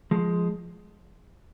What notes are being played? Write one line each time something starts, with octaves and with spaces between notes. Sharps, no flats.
F3 G#3